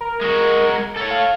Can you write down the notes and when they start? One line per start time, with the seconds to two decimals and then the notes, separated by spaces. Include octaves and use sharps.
0.01 A#4
0.22 G#3 F#4
0.96 A4 C#5
1.11 F5